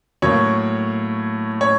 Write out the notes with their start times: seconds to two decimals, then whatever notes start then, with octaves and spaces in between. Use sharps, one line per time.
0.22 A2 F#3 A#3 C#5
1.61 C#5